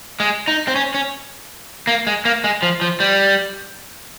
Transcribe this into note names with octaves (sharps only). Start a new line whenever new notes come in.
G#3
D#4
C4
C#4
C#4
A#3
G#3
A#3
G#3
F3
F3
G3